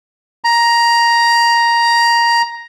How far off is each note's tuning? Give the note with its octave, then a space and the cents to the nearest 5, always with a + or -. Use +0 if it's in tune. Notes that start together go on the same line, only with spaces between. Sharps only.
A#5 +10